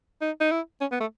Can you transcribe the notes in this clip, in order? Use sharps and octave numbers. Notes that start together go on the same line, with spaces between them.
D#4
D#4
E4
C#4
B3
A3